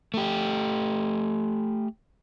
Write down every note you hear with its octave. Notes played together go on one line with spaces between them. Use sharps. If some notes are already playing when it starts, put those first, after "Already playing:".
A3 G4